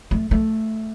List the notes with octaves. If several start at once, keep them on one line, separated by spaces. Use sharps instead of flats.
A3
A3